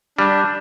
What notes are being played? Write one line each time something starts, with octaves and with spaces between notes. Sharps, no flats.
G3 D4